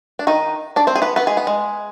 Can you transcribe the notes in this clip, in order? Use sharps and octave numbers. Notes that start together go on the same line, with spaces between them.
D4
D#3 D#4
D4 D5
C4 C5
G#4
B3 B4
B3 B4
G#3 G#4
B3
G#3